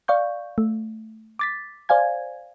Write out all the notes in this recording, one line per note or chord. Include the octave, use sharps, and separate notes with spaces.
D5 F5 C#6 G6
A3
D6 A6 B6
C5 D5 F5 G#5 G#6